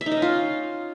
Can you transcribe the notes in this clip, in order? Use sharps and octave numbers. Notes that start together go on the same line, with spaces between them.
E5
D#4
D#5
C#4
F4